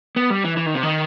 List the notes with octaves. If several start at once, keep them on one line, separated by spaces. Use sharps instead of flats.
B3
G3
E3
E3
D#3
C3
D#3